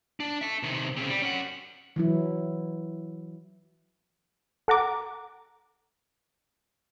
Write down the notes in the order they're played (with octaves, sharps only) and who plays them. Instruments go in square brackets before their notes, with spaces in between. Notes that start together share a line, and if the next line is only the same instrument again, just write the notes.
[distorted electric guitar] D4
E5 A5
C3 D#3
C#3 C4
G3
C#4 F#5
[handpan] E3 F#3 E4
[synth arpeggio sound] A4 F#5 A#5 D6